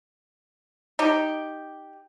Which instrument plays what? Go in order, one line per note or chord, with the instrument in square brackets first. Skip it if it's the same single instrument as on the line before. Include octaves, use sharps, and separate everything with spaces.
[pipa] D#4 G4